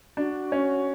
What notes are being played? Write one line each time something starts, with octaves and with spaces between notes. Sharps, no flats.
D4 F#4
C#4